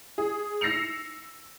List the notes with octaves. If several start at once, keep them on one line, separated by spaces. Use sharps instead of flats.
G#4
E6 A#6 C7 C#7 F7